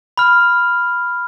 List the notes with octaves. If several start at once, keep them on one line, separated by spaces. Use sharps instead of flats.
B5 F6